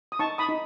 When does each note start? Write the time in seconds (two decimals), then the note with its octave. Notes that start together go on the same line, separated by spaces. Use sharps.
0.12 D#6
0.19 D#4 A5 C#6
0.38 B5 D#6
0.49 D#4